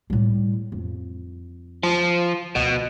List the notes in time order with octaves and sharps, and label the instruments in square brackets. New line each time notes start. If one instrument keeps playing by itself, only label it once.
[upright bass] A2 G3
F2
[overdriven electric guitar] F3
[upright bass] D2 [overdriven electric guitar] B2